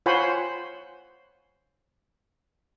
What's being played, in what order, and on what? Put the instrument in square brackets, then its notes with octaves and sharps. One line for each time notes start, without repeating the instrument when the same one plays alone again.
[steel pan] F4 C5 C#5 F#5 G#5 B5